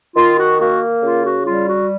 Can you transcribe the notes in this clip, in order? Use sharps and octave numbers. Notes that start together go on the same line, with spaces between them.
D#3 F4
F#4
A#3 F#4
C#3 F4
F#4
G3 F4
F#4